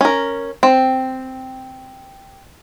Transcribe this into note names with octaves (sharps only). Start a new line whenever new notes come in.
C#4 A#4
C4